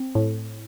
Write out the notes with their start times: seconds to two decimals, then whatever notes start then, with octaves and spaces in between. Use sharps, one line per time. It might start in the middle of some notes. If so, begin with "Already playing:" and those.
Already playing: C4
0.15 A2